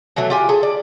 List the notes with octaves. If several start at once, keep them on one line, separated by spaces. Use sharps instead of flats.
B2 E3 F#3 A3
F4 G4 G#5
G#4 A4
D5